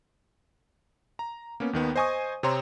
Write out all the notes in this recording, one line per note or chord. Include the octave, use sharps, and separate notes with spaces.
A#5
A#3 B3 C#4
D#2 D#3 B3
C5 D#5 G#5 C#6 D#6
C3 C4 C#5 A#5 C6